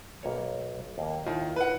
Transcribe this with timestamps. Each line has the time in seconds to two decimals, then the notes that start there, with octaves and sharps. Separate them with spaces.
0.23 B1 A#3 C#5
0.98 D#2 A#3
1.26 D#2 D#3 E4 F4
1.56 B4 F#5